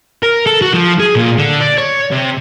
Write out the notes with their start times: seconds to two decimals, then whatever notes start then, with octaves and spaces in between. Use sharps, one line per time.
0.23 A#4
0.46 A4
0.62 F#4
0.73 F3
1.00 G#4
1.16 A#2
1.38 D3
1.60 D5
1.78 C#5
2.11 C3